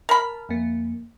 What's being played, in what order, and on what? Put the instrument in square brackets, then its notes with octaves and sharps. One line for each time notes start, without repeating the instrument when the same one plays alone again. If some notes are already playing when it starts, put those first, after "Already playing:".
[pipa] A#4 B5 [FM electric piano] A5 F6
[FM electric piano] F2 A#3